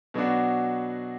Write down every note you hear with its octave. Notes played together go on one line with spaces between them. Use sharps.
B2 F#3 B3 D4 F#4